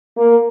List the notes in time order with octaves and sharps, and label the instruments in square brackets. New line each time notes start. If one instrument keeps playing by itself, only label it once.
[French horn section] A#3